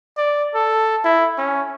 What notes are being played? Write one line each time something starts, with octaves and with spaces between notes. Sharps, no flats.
D5
A4
E4
C#4